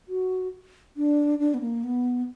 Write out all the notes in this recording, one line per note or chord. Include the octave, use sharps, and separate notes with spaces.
F#4
D4
D4
B3
A#3
B3